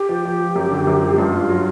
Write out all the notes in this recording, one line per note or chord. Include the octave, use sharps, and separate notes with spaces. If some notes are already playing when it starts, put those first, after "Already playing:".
Already playing: G4
F3
F3
F3
F#2
D3
F#2
F3
G2 F4
G2
F#3